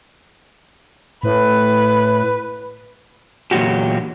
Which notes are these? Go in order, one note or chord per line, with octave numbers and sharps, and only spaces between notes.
A2 B4
E2 A#2 D3 F#3 F#4 G4